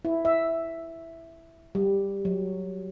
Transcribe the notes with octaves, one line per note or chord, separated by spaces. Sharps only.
E4
E5
G3
F#3